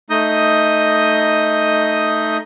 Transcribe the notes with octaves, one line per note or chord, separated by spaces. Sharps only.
A3 D#4 D#5 D#6 G6